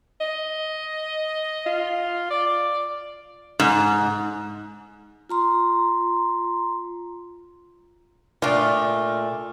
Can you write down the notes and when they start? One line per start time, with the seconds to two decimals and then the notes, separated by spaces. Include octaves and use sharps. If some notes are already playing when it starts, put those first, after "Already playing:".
0.21 D#5
1.66 F4
2.31 D5
3.60 G#2
5.29 F4 A#5 C6
8.42 A#2 A3 D4 F4 D#5